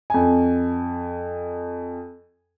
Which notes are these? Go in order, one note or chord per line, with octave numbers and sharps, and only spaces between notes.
F2 G#5